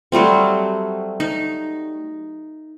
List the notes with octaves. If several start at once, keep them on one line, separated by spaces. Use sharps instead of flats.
F#3 G3 A3 C4
D#4